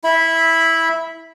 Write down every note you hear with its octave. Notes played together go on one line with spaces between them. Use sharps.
E4 E5 B5